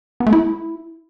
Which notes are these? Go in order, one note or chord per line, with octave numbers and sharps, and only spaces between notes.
B3
A3
E4